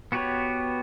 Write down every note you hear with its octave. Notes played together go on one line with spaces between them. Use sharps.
B3 F#4 G4 B4 C#5